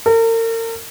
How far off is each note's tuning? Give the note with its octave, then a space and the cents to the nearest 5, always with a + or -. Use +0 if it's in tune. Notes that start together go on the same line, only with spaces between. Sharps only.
A#4 -40